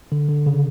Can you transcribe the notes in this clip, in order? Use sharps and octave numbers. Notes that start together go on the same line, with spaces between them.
D3
D3
C#3